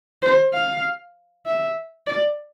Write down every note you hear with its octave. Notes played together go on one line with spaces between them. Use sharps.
C5
F5
E5
D5